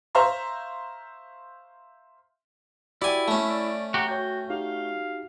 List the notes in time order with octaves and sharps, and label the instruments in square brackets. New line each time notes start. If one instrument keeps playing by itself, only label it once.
[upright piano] C5 E5 F5 A#5 C6 C#6
[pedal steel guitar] E4 [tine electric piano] F#4 G4 G5 [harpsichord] D5 G#5
[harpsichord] A3 C#4 [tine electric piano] A5
[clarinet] D5
[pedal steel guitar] F#4 G4 [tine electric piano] A#5
[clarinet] F#4 [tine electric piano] C#5 G5 [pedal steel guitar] G6
[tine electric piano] D#4 F#4 G4 [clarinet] F5